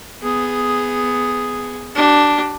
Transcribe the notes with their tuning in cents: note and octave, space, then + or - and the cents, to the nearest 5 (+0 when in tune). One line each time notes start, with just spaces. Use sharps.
B3 +15 G#4 +0
D4 +0 G4 -45